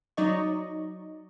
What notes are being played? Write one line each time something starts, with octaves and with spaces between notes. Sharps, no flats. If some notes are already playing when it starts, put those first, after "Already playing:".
F#3 D#4 D5 D#5 C#6